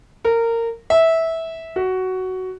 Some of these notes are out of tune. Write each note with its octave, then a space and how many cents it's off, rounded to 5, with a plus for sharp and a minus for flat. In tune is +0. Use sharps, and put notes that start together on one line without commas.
A#4 -20
E5 -15
F#4 +10